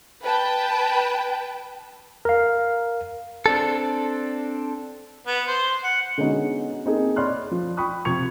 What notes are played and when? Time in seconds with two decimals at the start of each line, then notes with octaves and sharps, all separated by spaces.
0.23 B4 G5 A5
2.25 A#4 F5
3.46 C4 D4 A4
5.26 B3
5.47 C5
5.83 F#5
6.18 D3 G#3 B3 C#4 D#4 F#4
6.85 A#3 C4 D#4 G#4 A4
7.16 C#5 D5 B5 C6 F6 F#6
7.51 F3
7.77 G5 B5 C#6 D#6 F#6
8.05 C3 F3 C#6 G#6 C#7 F7